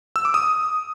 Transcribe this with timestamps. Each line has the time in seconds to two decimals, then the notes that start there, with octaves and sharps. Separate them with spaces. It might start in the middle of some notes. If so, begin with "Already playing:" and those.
0.16 E6
0.25 D6
0.34 D#6